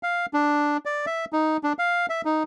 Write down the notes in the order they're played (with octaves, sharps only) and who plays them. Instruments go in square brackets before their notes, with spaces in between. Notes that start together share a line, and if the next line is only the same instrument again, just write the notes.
[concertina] F5
D4
D5
E5
D#4
D4
F5
E5
D#4